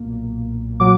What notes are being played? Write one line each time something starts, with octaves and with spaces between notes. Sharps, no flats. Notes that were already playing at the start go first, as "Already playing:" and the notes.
Already playing: B1 A#2 A#3
A#2 F#3 D6